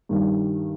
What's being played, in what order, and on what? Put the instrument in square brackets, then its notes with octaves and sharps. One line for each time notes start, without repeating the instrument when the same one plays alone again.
[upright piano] G2 D#3 G3